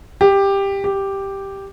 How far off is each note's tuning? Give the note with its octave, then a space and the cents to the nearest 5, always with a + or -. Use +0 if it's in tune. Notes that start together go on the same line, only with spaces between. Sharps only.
G4 +10
G4 +0